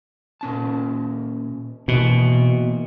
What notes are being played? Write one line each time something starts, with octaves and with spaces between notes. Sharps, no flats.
A#2 C#4 A5
B2 E3 A#3